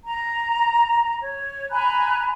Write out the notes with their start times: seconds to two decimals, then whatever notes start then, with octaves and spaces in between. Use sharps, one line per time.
0.04 A#5
1.21 C#5
1.70 G#5 A#5 B5 F#6